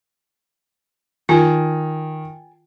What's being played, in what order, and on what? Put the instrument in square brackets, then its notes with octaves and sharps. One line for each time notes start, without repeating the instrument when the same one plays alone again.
[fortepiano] D#3 [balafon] F4 [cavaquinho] G#4 A5